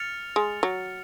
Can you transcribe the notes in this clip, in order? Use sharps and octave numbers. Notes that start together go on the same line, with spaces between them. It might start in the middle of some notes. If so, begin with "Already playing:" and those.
Already playing: F6 A6 C#7 F7
G#3
F#3